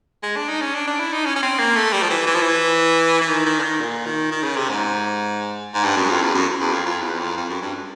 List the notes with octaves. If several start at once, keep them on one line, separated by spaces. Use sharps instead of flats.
G#3
D4
D#4
C#4
D4
D4
E4
D#4
C#4
C#4
C4
A#3
A3
G3
F3
E3
E3
F3
E3
E3
D#3
D#3
D3
D#3
A#2
D#3
D#3
C#3
C3
G#2
G#2
G2
F#2
F2
E2
F#2
E2
F2
F2
E2
F2
F2
F#2
G2